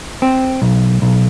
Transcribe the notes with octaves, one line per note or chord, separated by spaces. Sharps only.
C4
B1
B1